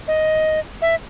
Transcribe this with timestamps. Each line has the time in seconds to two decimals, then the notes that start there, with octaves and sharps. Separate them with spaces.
0.08 D#5
0.82 E5